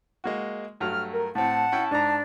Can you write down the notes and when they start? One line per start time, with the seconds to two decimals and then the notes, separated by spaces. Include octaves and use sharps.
0.24 G#3 A#3 F#4
0.80 G2 F#3 A3 F6
1.13 A#4
1.35 A2 C4 F#5 A5
1.72 C#4 E4 G5
1.91 G#2 D4 A#5